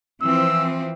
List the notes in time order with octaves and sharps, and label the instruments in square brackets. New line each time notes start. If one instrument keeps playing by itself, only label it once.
[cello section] E3 F3 C4 [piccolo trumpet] E6